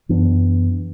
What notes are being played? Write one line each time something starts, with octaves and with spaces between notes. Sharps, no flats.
F#2 E3 B3 D4